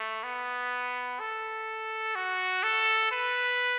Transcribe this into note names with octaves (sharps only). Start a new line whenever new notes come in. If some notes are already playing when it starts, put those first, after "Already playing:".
Already playing: A3
B3
A4
F#4
A4
B4